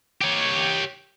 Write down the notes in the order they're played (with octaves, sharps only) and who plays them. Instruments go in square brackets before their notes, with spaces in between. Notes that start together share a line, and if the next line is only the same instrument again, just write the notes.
[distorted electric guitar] G4 C#5